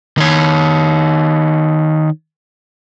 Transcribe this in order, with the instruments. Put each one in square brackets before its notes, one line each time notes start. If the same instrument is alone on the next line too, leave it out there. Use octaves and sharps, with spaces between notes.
[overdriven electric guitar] D#3 C#5